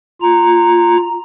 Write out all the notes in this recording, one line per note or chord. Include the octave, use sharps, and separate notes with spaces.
F4 A#5